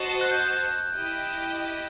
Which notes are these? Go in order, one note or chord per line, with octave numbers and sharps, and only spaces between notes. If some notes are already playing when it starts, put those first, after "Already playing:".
Already playing: F#4 C5 D#5 A5
F#6
G6
F#6
E4 G4 D#5